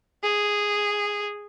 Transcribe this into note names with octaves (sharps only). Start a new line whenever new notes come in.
G#4